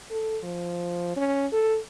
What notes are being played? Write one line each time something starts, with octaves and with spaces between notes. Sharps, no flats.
A4
F3
C#4
A4